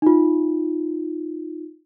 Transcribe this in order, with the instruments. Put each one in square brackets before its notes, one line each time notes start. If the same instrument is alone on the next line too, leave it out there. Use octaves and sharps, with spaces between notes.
[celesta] D#4 F4